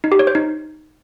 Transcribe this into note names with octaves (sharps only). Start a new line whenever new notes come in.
D#4
G4
C#5
C5
D#4